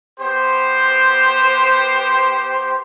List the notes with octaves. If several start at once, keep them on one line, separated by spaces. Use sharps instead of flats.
B3 G4 C5